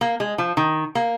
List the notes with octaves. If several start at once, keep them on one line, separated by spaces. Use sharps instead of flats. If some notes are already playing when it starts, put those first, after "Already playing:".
A#3
G#3
F3
D#3
A#3